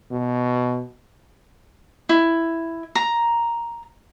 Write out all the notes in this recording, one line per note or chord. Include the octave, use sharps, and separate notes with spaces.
B2
E4
A#5